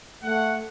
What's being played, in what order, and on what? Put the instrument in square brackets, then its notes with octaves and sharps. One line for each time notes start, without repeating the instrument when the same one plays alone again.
[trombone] A3 [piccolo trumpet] F#5